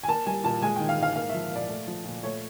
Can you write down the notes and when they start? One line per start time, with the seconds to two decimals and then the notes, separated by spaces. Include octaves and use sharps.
0.03 G#5
0.08 A#3 A5
0.26 G3 G#5
0.44 A#2 A5
0.62 G#3 G#5
0.76 D#3 G5
0.89 F5
0.98 G#2
1.03 F5
1.16 A#3 F5
1.29 E5
1.34 F3
1.51 A#2 D5
1.69 A3
1.87 F3
2.05 A#2
2.23 A3 C#5